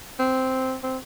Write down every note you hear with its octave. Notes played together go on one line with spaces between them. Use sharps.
C4
C4